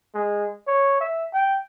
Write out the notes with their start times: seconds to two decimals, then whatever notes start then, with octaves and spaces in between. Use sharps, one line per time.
0.14 G#3
0.67 C#5
1.00 E5
1.33 G5